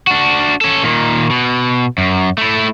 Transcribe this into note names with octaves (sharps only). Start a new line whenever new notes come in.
D4 F#4
C#4 A4
A#2 D#3
B2
F#2
A3 E4